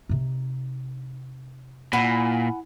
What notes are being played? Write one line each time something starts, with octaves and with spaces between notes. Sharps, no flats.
C3 D#4
A#2 E4 F#5 G#5